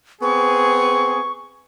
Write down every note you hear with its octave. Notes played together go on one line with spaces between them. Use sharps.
B3 C4 G#4 C#6